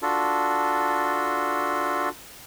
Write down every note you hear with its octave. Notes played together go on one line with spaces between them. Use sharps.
D4 F4 F#4 A4